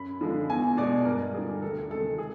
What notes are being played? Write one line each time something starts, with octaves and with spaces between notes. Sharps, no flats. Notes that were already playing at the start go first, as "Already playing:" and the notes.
Already playing: F#2 B5
D3 F3 G#3
E2 G#5
B2 G#3 D5
G2 A#4
D3 G3 G#4
A#4
D2 A4
C3 D#3 G#3 A4
G#4